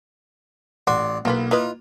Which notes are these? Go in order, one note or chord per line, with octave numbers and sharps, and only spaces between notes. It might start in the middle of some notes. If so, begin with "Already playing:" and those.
A1 F#4 D5 C6
B1 E3 A#3 F4 B4
E4 F4 B4 D#5